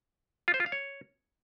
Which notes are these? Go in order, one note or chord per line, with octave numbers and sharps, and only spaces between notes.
F4
C5
F4
F5
C#5